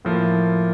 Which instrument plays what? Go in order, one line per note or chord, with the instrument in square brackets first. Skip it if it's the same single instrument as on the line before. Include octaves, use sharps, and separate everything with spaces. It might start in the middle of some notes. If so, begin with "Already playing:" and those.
[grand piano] A2 F3 A#3